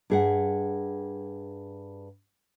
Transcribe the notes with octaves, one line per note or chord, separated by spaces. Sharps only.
G2 G#4 F#5